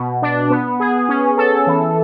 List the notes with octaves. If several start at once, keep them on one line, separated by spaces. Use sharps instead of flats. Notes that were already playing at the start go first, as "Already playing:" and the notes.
Already playing: B2
D4
B3
G#4
C#4
A4
E3